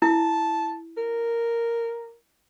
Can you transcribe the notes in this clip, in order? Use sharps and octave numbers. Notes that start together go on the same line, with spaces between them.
E4 A5
A#4